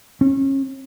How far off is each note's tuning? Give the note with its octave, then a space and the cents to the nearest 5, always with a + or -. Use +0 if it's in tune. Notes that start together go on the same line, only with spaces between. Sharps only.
C#4 -30